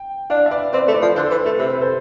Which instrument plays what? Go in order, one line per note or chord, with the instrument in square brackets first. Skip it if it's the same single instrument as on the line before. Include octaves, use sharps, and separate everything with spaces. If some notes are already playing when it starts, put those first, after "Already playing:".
Already playing: [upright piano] G5
[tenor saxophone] D4 [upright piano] D5 F5
[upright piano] E5
B4 D5
[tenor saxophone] C4 [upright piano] B4 D5
[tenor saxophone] A3
[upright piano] B4 D5
[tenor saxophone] F3
[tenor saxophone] D3 [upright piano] A4 C5
[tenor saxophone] E3 [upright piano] B4
[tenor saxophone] A3 [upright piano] A4
[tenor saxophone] C3 [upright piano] B4
[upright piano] B4
A4 C5